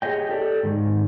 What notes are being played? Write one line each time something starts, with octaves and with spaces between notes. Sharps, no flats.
G4 G#4 B4 C#5 D#5 G5
G4 A4 D5
G#2 D#3